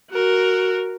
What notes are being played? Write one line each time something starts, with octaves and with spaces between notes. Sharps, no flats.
F#4 A#4